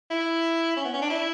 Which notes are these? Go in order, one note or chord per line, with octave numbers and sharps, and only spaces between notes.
E4
C#4
B3
C#4
D4
E4